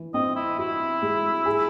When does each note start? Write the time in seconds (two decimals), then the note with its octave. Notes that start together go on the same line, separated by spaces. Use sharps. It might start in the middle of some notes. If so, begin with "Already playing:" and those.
Already playing: E3
0.14 C4 D#5
0.36 E4
0.58 E4 F#4
1.02 G#3
1.46 G#4